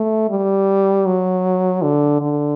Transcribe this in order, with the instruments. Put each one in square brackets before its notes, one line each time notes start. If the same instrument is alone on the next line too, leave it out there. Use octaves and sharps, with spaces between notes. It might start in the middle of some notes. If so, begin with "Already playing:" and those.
Already playing: [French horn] A3
G3
F#3
D3
D3